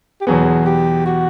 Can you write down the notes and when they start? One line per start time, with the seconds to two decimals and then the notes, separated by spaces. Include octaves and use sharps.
0.21 G4
0.27 E2 B2 F#3 B3 G#4
0.66 G4
1.06 F#4